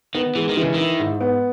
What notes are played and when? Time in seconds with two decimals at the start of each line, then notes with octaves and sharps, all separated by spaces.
0.15 D#3 B3
0.35 E3 G#3
0.49 D#3
0.57 C#3 E3
0.74 D#3 E4
0.99 G#2
1.21 B3